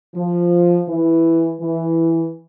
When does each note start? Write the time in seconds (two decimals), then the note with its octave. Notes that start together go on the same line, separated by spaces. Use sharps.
0.15 F3
0.88 E3
1.60 E3